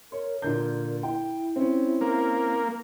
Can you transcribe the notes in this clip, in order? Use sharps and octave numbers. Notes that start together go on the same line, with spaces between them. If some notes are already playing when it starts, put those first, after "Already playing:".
A#4 C#5
A#2 D3 A#4 G6
E4 G5
C4 C#4
A#3